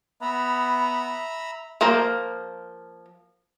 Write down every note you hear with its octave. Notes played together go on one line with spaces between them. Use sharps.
B3 E5 A#5 B5
F3 A#3 A#4 C5